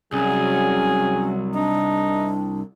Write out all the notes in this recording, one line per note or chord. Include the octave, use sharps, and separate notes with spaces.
C2 F#3 C#4 G#4
D4 D#4